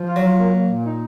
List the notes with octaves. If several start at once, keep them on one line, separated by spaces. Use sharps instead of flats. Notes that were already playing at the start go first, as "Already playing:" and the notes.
Already playing: F3
F4
F#3
F4
A#3
A#3
A#2
D#4